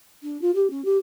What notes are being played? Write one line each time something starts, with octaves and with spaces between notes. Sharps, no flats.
D4
F4
G4
C#4
G4